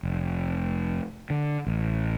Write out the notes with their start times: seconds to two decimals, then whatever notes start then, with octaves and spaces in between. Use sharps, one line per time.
0.03 F1
1.30 D3
1.66 A1